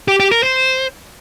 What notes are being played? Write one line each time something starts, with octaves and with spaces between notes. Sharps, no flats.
G4
G4
A#4
C5